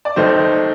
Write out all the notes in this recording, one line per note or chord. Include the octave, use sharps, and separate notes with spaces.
D5
D#2 D#3 A3 D#4 C5